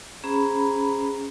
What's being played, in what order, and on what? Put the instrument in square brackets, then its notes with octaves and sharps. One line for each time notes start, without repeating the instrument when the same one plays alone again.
[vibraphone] C#4 G#4 C5 A#5 B5